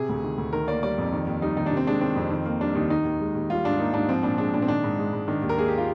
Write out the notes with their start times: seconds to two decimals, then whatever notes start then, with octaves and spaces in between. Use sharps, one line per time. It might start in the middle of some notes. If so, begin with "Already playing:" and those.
Already playing: C3 G#4
0.09 D2
0.23 D#3
0.38 D2
0.53 D#3 A#4
0.67 A#3 D5
0.82 G3 D5
0.98 F2
1.13 D#3
1.27 D#2
1.42 G3 D#4
1.57 D#2 D#4
1.66 C3 D4
1.77 C4
1.87 G#3 D4
2.01 D#3 C4
2.16 F2
2.30 D#3
2.45 A#3
2.61 G3 D4
2.75 D#2 D#4
2.90 D#3 D#4
3.05 D#2
3.20 G#3
3.35 D#2
3.50 G3 F4
3.65 G#2 D4
3.79 A#3 D#4
3.94 G#2 D4
4.09 F3 C4
4.23 A#2 D4
4.38 G#3 D4
4.54 A#2 D4
4.62 C4
4.68 D#3 D4
4.84 G#2
4.98 G#3
5.13 G#2
5.28 D#3 D4
5.42 D#2
5.49 A#4
5.57 A#3 G#4
5.68 G4
5.78 F4